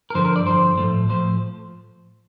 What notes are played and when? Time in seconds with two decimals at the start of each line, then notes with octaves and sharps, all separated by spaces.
0.10 A#4
0.15 G2 D3 F3 C5
0.25 A#4
0.36 D5
0.46 G2 D3 F3 C5
0.78 A2 F3 A3
1.09 A2 F3 A3 C5